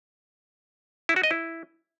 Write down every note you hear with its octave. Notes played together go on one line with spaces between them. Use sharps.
E4
F#4
D#5
E4